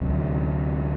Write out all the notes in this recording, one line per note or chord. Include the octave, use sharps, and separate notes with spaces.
D2 C3 F#3